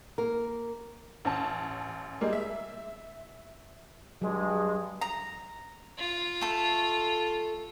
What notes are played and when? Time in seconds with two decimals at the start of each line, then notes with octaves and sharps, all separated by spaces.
0.18 A#3 A#4
1.25 A1 C#4 A5
2.21 G3 G#3 A#3
2.33 E5
4.22 G2 F#3 G#3
5.01 A#5
5.98 F4
6.41 A3 A4